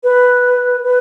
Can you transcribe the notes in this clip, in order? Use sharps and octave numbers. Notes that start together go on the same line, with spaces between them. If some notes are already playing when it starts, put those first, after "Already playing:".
B4
B4